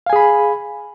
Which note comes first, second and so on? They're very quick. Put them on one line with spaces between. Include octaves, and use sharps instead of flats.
F5 G#5 G#4 B5